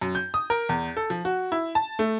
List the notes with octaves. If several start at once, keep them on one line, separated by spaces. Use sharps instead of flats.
F#2
G6
D#6
A#4
E2
A4
F3
F#4
E4
A5
A3